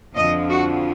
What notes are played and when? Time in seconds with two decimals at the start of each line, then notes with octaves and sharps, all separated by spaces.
0.16 F2 D3 F3 D#5
0.49 F#4